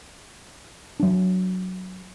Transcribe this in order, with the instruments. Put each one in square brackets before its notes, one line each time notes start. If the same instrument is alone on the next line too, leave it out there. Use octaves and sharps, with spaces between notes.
[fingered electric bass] F#3 D4